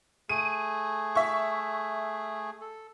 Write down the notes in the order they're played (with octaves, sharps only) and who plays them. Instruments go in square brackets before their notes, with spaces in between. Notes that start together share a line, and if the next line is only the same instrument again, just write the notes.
[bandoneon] A3 G#4 [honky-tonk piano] D#7
[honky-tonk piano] E5 C#6
[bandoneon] A4